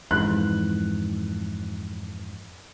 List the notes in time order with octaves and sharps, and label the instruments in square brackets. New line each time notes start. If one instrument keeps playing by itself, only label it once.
[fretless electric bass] F2 G#2 E3 [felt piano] F#6